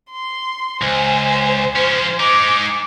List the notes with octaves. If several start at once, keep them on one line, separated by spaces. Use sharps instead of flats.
C6
C#2 C5 G#5
F3 C#4 C5
G#3 D#4 D6